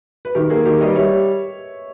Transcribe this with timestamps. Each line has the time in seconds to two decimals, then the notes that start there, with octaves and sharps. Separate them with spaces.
0.25 B4
0.35 D#3 G4 A#4
0.50 A#3 G#4
0.65 D#3 G4 A#4
0.80 G3 B4 D#5
0.96 G3 C#5 E5